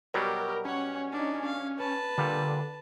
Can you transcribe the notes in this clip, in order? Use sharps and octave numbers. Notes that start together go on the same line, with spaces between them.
B2 F#3 G3 G4 A#4
C#4 C#5 F#5
D4 D#4
F5
B4 A5
A#2 D3 G3